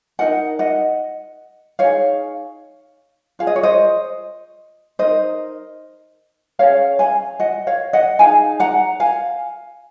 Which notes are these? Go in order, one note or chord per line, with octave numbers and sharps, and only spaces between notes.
D#4 A#4 D#5 F#5
D#5 F#5
D#4 G#4 C#5 F5
F4 G#4 F5
D#5
C#5
C5 D#5
D#4 A#4 C5 D#5
C#4 G#4 C#5 F5
F5 G#5
D#5 F#5
C#5 F5
D#5 F#5
D#4 G#4 F5 G#5
F#5 A#5
F5 G#5